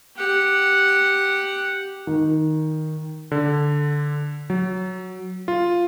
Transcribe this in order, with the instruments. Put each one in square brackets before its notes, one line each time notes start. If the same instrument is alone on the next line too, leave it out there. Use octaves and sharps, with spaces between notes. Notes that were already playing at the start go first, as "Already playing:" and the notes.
[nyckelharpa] G4 F#5
[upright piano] D#3
[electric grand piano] D3
F#3
F4